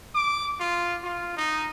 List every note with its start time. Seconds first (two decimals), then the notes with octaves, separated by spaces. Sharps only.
0.15 D6
0.60 F4
1.03 F4
1.37 D#4